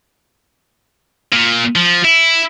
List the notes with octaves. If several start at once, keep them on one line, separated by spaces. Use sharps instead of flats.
A#2
F3
E4